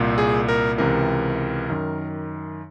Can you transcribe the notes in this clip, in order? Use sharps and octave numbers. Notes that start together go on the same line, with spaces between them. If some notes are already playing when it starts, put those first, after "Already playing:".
Already playing: C2 A#2
G#4
A#4
C#2 C3 E3 A#4
F#2 D#3